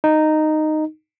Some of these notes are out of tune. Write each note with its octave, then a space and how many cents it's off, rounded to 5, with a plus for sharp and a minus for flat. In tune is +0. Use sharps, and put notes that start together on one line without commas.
D#4 -10